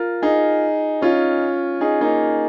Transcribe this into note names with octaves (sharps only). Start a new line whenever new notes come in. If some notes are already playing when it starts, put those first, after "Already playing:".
Already playing: F4 A#4
D#4 G#4
C#4 F4
D#4 G#4
A#3 D#4